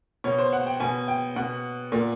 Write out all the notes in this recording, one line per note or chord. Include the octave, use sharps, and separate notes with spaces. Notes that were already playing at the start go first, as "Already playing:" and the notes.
B2 C#5
C5
F#5
G5
B2 G#5
G5
B2 F#5
A#2